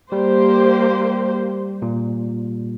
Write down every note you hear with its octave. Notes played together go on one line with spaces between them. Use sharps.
G3 A#3 G4 C5
A#2